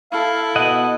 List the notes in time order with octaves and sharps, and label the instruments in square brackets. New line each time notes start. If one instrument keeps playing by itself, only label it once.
[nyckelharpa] E4 A4 [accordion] F5
[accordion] B2 [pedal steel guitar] D#5 F#5